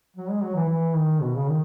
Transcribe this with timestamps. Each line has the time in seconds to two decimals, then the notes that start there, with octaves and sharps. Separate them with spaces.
0.17 F#3
0.30 G#3
0.43 F#3
0.56 E3
0.69 E3
0.96 D#3
1.22 B2
1.35 C#3
1.49 D#3